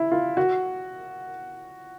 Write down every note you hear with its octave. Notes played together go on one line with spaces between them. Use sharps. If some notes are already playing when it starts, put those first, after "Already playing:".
Already playing: E4
F4
F#4